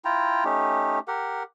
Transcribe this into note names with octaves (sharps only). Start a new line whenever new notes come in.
E4 F4 G5 A#5
A3 C#4 D#4 G4
G4 A#4 F#5